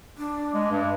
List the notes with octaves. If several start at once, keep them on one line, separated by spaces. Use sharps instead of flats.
D4
G#3
G2